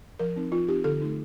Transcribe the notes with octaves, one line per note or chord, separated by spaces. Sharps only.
F3 A#4
C4 D#4
F3 F4
C4 D#4 G4
D3 A4
A3 D#4